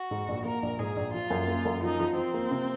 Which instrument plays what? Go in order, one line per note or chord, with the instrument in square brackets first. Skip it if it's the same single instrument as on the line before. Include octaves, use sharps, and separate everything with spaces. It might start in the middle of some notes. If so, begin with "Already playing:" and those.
Already playing: [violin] F#4
[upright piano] G#2
A#1
[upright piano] A#3 [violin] A#4
[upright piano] A#1
[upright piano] G#2 [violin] G#4
[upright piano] A#1
[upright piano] F3 [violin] F4
[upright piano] F#2
A#3
F#2
[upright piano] F3 [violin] D#4
[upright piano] F3
[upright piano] F3 [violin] C4
[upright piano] A#3
C3